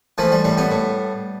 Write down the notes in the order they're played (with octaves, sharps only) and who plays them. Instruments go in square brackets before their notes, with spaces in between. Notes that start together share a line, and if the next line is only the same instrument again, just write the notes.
[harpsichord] E3 F3 A3
G3
A2 G3
G3 B3
A2